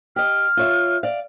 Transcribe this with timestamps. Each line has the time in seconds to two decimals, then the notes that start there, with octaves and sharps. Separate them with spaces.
0.16 G4 D#5 F6
0.57 F4 C#5 E5
1.03 D5 F5